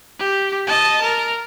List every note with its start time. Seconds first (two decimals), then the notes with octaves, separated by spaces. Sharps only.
0.19 G4
0.67 D#5 A5
1.02 A#4